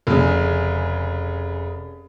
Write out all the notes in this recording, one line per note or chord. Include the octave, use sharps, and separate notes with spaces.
F1 C#3